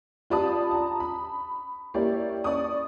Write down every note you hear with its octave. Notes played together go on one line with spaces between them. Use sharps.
F4 G4 D5 A5 B5 D#6
A5 A#5
B5
A#3 E4 G4 C#5 D5
D5 C#6 D#6